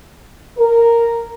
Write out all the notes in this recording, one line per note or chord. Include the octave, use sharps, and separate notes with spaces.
A#4